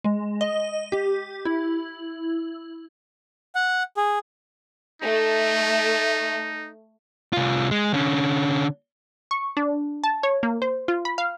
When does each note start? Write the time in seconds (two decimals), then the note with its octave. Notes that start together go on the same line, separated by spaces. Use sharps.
0.04 G#3
0.41 D#5
0.92 G4
1.45 E4
3.55 F#5
3.97 G#4
5.02 A3 D#4
7.33 C2 F4
7.71 G#3
7.94 D3 C#4
9.31 C#6
9.57 D4
10.04 A5
10.23 C#5
10.43 A#3
10.62 C5
10.88 F4
11.05 B5
11.18 F5